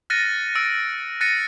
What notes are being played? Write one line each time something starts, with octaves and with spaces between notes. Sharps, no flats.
F6 F#6 A6 A#6 C#7 D#7
E6 A6 D7
F#6 A6 A#6 C#7 D#7